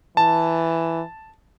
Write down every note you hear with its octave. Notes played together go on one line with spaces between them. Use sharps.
E3 A5